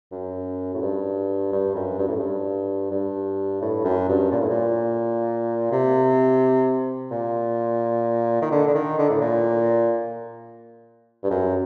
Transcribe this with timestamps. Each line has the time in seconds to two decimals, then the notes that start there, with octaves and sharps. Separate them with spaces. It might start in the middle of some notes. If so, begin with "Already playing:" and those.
0.12 F#2
0.74 A2
0.82 G2
1.52 G2
1.75 F#2
1.99 G2
2.08 A2
2.19 G2
2.91 G2
3.62 A2
3.84 F#2
4.09 G2
4.32 A#2
4.40 A2
4.50 A#2
5.72 C3
7.11 A#2
8.42 D#3
8.51 D3
8.67 D3
8.74 D#3
8.98 D3
9.10 A2
9.21 A#2
11.23 G2
11.30 F#2